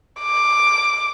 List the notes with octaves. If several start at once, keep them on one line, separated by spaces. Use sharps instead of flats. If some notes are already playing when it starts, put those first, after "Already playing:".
D6